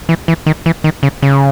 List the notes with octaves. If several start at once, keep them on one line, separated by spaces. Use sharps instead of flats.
E3
E3
D#3
E3
D#3
C#3
C#3